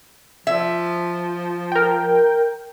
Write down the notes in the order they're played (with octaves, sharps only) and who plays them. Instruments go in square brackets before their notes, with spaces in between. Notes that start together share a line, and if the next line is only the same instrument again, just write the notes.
[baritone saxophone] F3 [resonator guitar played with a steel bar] E5
[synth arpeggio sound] A#4 G5